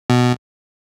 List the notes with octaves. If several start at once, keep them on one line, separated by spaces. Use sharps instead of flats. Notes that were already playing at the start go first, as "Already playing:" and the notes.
B2